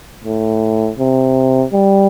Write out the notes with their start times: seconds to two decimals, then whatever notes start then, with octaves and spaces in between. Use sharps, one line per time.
0.24 A2
0.99 C3
1.73 G3